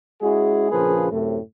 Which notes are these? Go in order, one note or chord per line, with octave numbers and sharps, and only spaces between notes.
G#3 C#4 E4 F#4 G#4
A#1 C#3 F3 A#3 G#4 B4
F#2 A2 C3